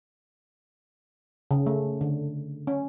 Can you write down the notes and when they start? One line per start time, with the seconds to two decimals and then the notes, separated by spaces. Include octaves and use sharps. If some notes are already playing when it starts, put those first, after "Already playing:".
1.51 C#3
1.66 A3
2.01 D3
2.67 C#4